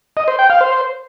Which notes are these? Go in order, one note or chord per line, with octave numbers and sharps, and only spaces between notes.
D#5
C5
G5
F5
C5